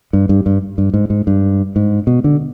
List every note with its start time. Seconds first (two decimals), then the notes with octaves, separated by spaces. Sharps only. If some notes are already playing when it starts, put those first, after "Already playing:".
0.13 G2
0.29 G2
0.46 G2
0.78 G2
0.94 G#2
1.10 G#2
1.27 G2
1.76 G#2
2.07 B2
2.24 D3